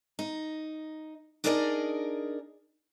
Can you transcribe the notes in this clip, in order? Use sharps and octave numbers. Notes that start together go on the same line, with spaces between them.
D#4
D4 D#4 G#4 A#4 D5 D#5